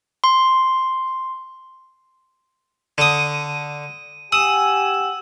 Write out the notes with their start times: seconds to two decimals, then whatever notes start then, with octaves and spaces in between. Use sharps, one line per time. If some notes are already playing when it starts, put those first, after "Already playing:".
0.24 C6
2.98 D3 D#6 D#7
4.32 G4 F#5 G#5 D#6 E6 E7